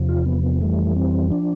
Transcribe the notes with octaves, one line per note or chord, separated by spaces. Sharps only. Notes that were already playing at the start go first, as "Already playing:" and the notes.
Already playing: E2 C3 F3
F4
B3
B3
F2 E3 G3 A3
C4
F3 D4